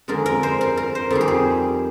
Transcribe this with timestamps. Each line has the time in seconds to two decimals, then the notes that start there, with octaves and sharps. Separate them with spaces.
0.08 F2 D3 G#3 A#4
0.26 A#4
0.43 C5
0.61 A#4
0.77 A#4
0.95 C5
1.11 F2 D#3 G3 G#4
1.21 G4
1.28 G#4